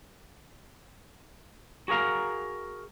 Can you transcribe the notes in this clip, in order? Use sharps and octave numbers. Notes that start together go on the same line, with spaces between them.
F#4 G#4 A#4 F5 A#5